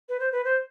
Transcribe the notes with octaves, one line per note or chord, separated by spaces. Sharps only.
B4
C5
B4
C5